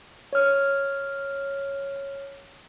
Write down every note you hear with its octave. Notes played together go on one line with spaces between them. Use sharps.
C#5 F6